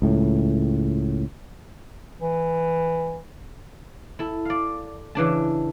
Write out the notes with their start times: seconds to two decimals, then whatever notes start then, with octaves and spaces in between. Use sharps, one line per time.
0.02 C#2 A2
2.21 E3
4.19 E4 A4
4.45 D5 F5
5.15 C#3 E3 D4 A5